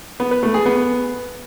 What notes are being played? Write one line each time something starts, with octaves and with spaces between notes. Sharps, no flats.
B3
B4
A3
G#4
B3